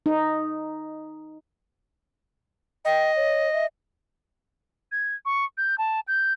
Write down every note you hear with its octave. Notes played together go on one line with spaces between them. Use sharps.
D#4
D#5 G5
C#5
E5
G#6
C#6
G6
A5
G6